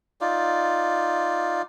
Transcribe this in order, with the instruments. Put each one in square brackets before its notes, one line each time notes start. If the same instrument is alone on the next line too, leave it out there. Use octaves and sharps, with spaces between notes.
[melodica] D#4 F4 D5